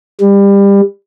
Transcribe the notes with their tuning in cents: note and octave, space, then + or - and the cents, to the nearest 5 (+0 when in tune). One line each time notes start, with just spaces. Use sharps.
G3 +25